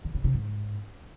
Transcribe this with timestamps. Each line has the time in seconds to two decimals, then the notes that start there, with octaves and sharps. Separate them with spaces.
0.05 D3
0.15 C#3
0.24 C3
0.34 G#2